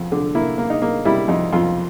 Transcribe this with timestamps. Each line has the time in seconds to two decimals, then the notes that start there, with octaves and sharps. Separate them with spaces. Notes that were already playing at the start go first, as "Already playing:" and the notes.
Already playing: F2
0.12 D3
0.35 A#3 E4
0.58 A#3
0.70 D#4
0.82 A#3
1.05 G3 E4
1.28 F2 D#4
1.53 F2 F4